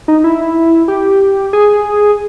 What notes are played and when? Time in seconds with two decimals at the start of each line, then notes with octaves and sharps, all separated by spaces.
0.08 D#4
0.24 E4
0.88 G4
1.53 G#4